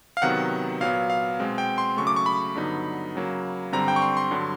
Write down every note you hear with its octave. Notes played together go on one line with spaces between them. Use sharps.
F5
C3 D#3 F#3 B3 F#5
A#2 F#3 B3 F5
F5
B2 G#3 C4
G5
C6
C#3 F#3 A3 C#6
D6
C#6
B5
G2 D3 F#3 B3 D#4
C#3 F#3 A#3
G2 D3 G3 C4 A#5
G5
C#6
C6
C6
G2 D3 F#3